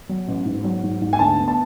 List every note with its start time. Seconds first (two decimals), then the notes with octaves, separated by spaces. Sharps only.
0.09 F#3
0.28 A1
0.46 G#2
0.64 F#3
0.83 G#2
1.02 G#2
1.13 G#5
1.19 D2 A5
1.39 B3
1.48 A5